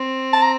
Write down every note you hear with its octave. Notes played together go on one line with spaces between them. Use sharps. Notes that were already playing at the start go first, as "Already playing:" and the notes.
Already playing: C4
A5
A#5